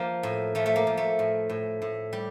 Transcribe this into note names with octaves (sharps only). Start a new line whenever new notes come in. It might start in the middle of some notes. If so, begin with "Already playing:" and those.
Already playing: F3 A#3
A2
F3 A3
A3
A#3
F3
A3
A2
A2
A2
G3